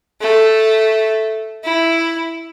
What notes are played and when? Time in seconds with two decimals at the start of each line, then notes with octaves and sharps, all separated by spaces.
0.21 A3
1.64 E4